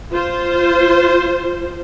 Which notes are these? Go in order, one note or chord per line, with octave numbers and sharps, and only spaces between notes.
F4 C5